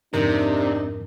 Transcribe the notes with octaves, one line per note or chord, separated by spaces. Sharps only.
F2 G#2 C3 D4 D#4 A#4